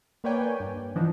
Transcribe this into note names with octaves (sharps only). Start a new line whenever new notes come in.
A#3 B4 C#5 D5 G5 G#5
G2
E3 F3 D4 D#4